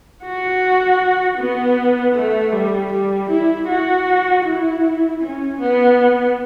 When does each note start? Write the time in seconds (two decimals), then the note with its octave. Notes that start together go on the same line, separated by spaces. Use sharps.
0.24 F#4
1.38 B3
2.15 A3
2.52 G3
2.92 G3
3.29 E4
3.67 F#4
4.45 E4
5.20 C#4
5.59 B3